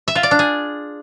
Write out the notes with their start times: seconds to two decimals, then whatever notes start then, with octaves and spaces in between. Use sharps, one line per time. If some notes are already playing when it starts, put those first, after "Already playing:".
0.08 E5
0.15 F4
0.23 D5
0.31 D4
0.39 G#4